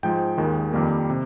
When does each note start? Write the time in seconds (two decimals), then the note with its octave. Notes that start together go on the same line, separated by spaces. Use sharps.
0.03 G#2 F3 G#3 G5
0.38 D#2 D#3 G#3
0.73 F2 D#3 G3 A#3
1.10 C3